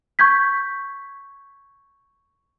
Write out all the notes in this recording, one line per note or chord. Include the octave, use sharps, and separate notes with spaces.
C#6 G6 G#6 B6